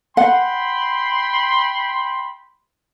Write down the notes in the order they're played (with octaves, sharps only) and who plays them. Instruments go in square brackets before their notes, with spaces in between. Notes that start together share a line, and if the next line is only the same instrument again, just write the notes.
[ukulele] F#5 [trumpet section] G5 B5 C6